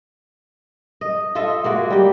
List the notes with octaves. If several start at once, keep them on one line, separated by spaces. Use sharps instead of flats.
D#5
F4 A4 D#5 E5
G#3 A#3 F#4
G3 G4